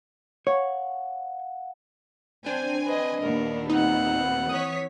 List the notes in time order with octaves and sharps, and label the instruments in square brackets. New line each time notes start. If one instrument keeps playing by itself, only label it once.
[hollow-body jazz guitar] C#5 [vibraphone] F5 F#5
[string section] C4 G#5 [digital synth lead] D4 [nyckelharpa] C5
[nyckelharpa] B4 D#5
[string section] D#2 A#2 B3 [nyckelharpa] A#4
[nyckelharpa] C4 F#5 [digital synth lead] D#4
[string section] E3 C#5 B6 [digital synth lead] D#6